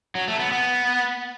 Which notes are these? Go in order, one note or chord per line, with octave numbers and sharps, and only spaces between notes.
F#3
A3
B3
B3